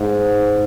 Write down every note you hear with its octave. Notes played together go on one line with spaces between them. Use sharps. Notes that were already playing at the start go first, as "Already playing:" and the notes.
Already playing: G#2